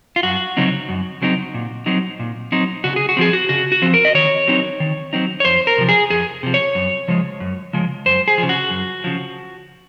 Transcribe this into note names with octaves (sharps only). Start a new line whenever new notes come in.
F4
F#2 F#4
C#3 F#3 C4 D#4
F#2
C#3 F#3 C4 D#4
A#2
F#3 C4 D#4
A#2
F#3 C4 D#4
C#3 F#4
G#4
F#4
F3 C4 G#4
F#4
C#3 F#4
F#4
F3 C4
A#4
D#5
D#3 C#5
F#3 C4 D#4
D#3
F#3 C4 D#4
C#5
F2 C5
A#4
C3 F3
G#4
F2 G#4
C3 F3
C#5
F#2
C#3 F3 G#3
F#2
C#3 F3 G#3
F#2 C5
G#4
F3
C#3
F#4
F#2
C#3 F3